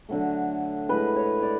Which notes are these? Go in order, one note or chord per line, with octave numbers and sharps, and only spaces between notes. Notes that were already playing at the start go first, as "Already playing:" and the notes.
D3 F#3 A3
A2 G#3 B4
C#5
D5